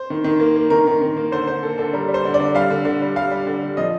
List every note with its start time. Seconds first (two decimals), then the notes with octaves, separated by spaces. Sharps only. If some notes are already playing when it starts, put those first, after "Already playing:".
Already playing: C5
0.10 D#3
0.24 D#3
0.40 A#3
0.56 A#3
0.70 D#3 A#4
0.87 D#3
1.02 D#3
1.17 A#3
1.32 D3 C5
1.47 D3 C5
1.63 A#3 A4
1.78 D3 A4
1.93 G3 A#4
2.08 G3
2.14 C5
2.25 D3
2.34 D5
2.40 D3
2.55 G3 F5
2.70 D3
2.85 D3
3.02 G3
3.16 G3 F5
3.31 G3
3.47 D3
3.63 G3
3.77 F3 D#5